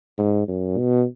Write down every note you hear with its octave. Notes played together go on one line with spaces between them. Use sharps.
G#2
F#2
B2